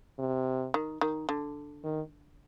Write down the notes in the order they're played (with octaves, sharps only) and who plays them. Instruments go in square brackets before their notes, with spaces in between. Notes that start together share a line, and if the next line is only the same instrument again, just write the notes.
[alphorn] C3
[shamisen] D#3
D#3
D3
[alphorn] D#3